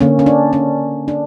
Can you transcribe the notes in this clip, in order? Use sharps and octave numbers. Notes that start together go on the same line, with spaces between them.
D3 A#3 C#4
C#4
D4
C#4
D4